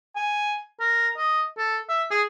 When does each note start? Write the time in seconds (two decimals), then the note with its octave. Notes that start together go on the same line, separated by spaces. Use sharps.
0.16 G#5
0.80 A#4
1.17 D#5
1.58 A4
1.89 E5
2.11 G#4